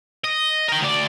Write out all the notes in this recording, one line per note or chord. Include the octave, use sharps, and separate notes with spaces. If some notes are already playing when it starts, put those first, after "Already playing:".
D#5
A#4 G5
D2 D5